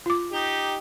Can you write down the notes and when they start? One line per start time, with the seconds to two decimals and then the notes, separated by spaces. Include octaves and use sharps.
0.06 F4 D6
0.32 D#4 G4